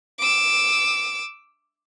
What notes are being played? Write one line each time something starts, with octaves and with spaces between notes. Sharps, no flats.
D6 E6